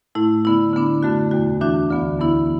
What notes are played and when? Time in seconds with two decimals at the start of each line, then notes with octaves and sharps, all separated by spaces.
0.15 A2 A3 E4
0.45 D3 B3 E4
0.73 D3 B3 D4
1.03 F#2 D3 A3 F#4
1.31 E2 B2 A3 F#4
1.61 F#2 E3 D4 F#4
1.90 D2 D3 B3
2.19 F#2 E3 B3 E4